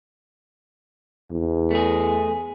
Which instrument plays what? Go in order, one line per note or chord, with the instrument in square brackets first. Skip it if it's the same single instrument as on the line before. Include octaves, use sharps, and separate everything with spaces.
[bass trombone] E2
[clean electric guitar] A3 G#4